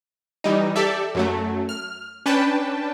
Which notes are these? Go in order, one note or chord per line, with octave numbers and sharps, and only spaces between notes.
E3 G3 D#4
G4 A4 D5 E5
F#2 F#3 A3
F6
C#4 D4 B4 G5 A5